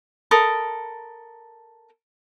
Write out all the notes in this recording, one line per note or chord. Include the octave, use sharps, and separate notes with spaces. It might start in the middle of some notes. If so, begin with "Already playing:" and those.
A4 A#4 B5 D#6